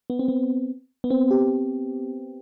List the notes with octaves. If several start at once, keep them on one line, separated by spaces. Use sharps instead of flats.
B3
C4
B3
B3
C4
G4